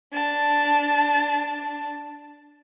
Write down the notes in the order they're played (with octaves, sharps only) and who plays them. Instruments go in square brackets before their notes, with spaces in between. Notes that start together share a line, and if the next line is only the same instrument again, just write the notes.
[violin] D4 A5